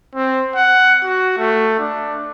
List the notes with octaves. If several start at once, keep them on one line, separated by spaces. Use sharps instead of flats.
C4
F#5
F#4
A3
D4